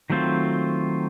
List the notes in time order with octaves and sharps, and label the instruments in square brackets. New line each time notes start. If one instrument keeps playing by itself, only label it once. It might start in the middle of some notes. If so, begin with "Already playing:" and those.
[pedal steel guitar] D#3 F#3 A3 C4 F4